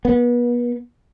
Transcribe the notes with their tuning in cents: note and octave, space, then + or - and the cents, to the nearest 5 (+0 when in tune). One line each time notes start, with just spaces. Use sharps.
B3 -35